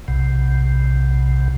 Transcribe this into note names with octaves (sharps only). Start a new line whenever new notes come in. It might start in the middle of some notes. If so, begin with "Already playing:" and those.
B1 C3